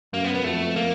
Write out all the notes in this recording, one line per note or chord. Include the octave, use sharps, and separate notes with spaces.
F#2 A#3
B3
B3
F2 A3
A#3